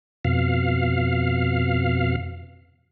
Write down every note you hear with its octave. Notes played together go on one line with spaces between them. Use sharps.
F2 B2 F5